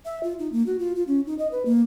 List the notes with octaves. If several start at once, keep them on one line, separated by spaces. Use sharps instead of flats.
E5
F4
D#4
A#3
F#4
F4
F4
C#4
D#4
D#5
B4
A#3